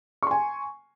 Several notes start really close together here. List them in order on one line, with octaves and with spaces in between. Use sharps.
C#6 C6 G#5